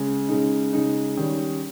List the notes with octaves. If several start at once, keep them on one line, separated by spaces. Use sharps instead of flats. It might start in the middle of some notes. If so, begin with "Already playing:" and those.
Already playing: C#3 G#3
C#3 G#3 D#4
C#3 G#3 D#4
D#3 G3 C#4